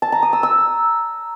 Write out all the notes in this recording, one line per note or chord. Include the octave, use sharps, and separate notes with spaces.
A5
A#5
D#6
E6
E6